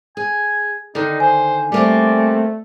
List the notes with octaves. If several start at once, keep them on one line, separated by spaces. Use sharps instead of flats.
G#4 G#5
D3 D#3 D#4
C5 G#5
G3 A3 A#3 C4 D5